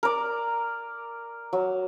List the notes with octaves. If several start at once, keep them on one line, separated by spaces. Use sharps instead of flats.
A#4 D5
F#3